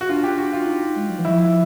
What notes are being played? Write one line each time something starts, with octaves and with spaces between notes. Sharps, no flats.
F#4
D4 F4
D4 G4
F#4
D4 F4
D#4
G#3
F#3
E3
F3 E4